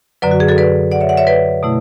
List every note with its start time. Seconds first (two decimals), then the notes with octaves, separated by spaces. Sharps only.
0.22 F#2 D3 F#3 B4 D5
0.31 F#4
0.40 G#4
0.48 F#4 A4
0.58 B4 D5
0.92 D5 F#5
1.01 C#5 E5
1.09 D5 F#5
1.17 C#5 E5
1.27 B4 D5
1.63 B2 A3 E4